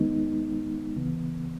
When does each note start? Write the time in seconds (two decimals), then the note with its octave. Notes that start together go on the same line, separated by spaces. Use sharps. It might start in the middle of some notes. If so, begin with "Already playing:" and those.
Already playing: D#2 D#3 G#3 B3 D#4
0.96 C#2 C#3 E3 B3